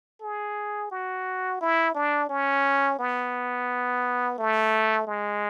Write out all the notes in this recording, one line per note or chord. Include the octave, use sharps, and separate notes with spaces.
G#4
F#4
E4
D4
C#4
B3
A3
G#3